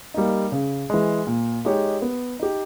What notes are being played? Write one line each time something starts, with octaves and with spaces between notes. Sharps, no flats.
G3 A#3 D#4
C#3
E3 G#3
A#2
G#3 D#4 G4 C#5
B3
D#4 G4